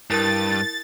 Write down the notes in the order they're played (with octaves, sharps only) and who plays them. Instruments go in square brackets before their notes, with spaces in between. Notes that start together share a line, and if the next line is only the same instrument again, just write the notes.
[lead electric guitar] G2 [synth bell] E4 A#4 [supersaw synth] A6